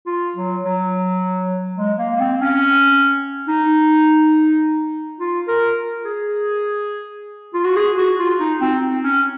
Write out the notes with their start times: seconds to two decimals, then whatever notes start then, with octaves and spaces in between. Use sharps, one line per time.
0.07 F4
0.36 F#3
0.64 F#3
1.78 G#3
1.99 A#3
2.16 A#3
2.20 C4
2.42 C#4
3.48 D#4
5.20 F4
5.48 A#4
6.05 G#4
7.54 F4
7.65 F#4
7.76 G#4
7.98 F#4
8.19 F4
8.40 D#4
8.61 C4
9.04 C#4